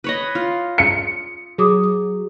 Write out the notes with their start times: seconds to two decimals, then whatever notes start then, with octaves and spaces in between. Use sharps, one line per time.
0.04 B4 C#5 D#5
0.35 F4
0.78 C#7
1.58 F#3 G#4 D6 D#6